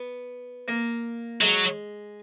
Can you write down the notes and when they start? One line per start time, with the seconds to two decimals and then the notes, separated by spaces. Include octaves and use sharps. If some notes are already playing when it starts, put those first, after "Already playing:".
Already playing: B3
0.68 A#3
1.41 F#3 G#3